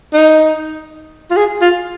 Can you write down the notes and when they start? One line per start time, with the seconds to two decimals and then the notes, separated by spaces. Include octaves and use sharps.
0.14 D#4
1.31 F4
1.37 G#4
1.62 F4